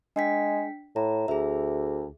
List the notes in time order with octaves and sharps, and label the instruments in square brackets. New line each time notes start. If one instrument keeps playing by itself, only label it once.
[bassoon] G#3 [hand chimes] D4 G5 B6
[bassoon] A2 [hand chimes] A#5
[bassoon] D2 [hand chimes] G#4 E5